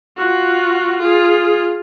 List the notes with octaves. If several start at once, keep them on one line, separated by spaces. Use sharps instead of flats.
F4 F#4
F4 G#4